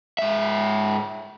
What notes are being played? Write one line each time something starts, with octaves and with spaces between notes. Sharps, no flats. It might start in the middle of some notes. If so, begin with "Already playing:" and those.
G#2 E5